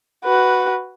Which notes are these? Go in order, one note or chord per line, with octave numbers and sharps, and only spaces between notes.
F#4 B4